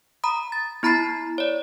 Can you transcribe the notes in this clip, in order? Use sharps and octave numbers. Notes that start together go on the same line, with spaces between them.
A#5 B5 D#6
A6
B3 E4 A#5 B5 A6 C7
C#5 D5